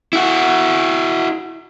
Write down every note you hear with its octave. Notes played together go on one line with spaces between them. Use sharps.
E4 F#4